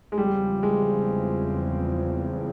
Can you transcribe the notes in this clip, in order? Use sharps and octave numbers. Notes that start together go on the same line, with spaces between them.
G#3
E2 C#3 F3 G3 C4
G#3